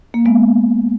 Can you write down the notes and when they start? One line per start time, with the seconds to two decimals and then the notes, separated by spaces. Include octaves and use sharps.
0.14 A#3
0.25 G#3 B3